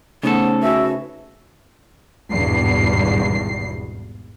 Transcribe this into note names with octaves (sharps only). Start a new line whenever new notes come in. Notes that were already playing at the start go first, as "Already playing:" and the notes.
C#3 A3 B3 D#4 A4 C5
F#4 B4 E5 G#5
G#1 E2 G2 B2 C7